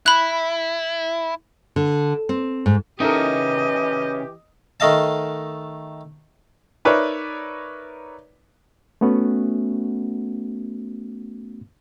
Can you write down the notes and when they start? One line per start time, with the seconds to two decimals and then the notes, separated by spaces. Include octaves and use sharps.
0.06 E4 B5 F#6
1.76 D3
2.29 C4
2.66 G#2
3.00 C#3 E3 D#4 G4 A4 A#4 D#5
4.80 D#3 A3 D#5 F5 A5
6.85 D#4 A#4 B4 C#5 D5 E5
9.01 A3 B3 C#4 F#4